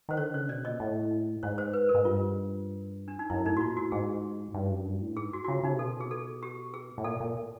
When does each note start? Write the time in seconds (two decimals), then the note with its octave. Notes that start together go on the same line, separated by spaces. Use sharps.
0.09 D#3 C5
0.17 D3 C#5
0.34 C#3 C#5
0.49 B2 D5
0.65 A#2 D#5
0.80 A2
1.43 G#2 C#5
1.58 C5
1.73 B4
1.89 A#4
1.95 G#2
2.05 G2 F4
3.08 D4
3.19 D#4
3.30 F#2 E4
3.45 A2 D#4
3.57 F#4
3.61 A#2 F4
3.77 A2 F#4
3.92 G#2 G#4
4.54 G2
4.71 F#2
4.86 G2
5.02 A2
5.17 G#2 G#4
5.33 F#4
5.44 F#4
5.48 C#3 F4
5.63 C#3 D#4
5.72 C3
5.79 B2 A4
6.01 G#4
6.11 A4
6.43 G4
6.74 G#4
6.98 A2
7.04 A#2 A4
7.20 A#2